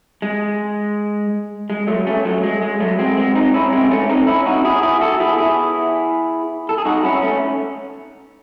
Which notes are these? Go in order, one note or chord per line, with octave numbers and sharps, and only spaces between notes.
G#3
G#3
F#3 A3
A3 C#4
F#3 A3
G#3
G#3
F#3 A3
G#3 C4
G#3 C4
C4 D#4
C#4 E4
G#3 C4
A3 C#4
C4 D#4
C#4 E4
D#4 F#4
E4 G#4
E4 G#4
F#4 A4
E4 G#4
E4 G#4
A4
G#4
D#4 F#4
C#4 E4
A3 C#4